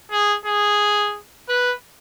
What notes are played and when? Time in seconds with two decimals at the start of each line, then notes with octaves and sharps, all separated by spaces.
0.12 G#4
0.46 G#4
1.49 B4